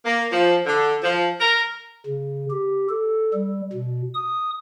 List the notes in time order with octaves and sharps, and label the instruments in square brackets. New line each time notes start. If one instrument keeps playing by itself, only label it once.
[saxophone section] A#3
F3
D3
F3
A#4
[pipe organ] C#3
G4
A4
G3
B2
D#6